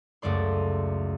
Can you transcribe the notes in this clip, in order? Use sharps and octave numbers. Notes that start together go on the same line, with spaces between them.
C#2 F#2 A3 D5 C6